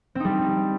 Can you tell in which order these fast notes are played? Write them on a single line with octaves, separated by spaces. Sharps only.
C4 D#4 G3